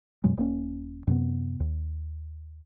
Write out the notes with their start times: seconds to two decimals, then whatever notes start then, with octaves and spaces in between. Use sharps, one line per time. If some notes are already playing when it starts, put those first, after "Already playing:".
0.24 F#2 B2 F#3 G#3
0.37 D#1 A#3 C#4
1.07 F#2 C3 B3
1.60 D#2